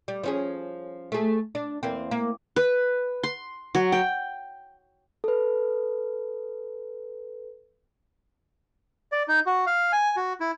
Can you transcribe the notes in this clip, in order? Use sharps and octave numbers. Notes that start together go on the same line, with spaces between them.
G3
F3 C#4 G#4
A3 G#4
D4
E2 A#3 C4
A#3
B4
C6
F#3
G5
A4 B4
D5
D#4
F#4
F5
G#5
F#4
E4